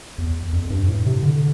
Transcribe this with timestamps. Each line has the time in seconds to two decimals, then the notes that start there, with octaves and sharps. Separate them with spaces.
0.18 E2
0.53 F2
0.70 G2
0.88 A2
1.06 C3
1.23 D3